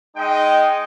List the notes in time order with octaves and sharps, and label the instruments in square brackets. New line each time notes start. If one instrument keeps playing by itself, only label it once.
[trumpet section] G#3 D#4 D#5 G5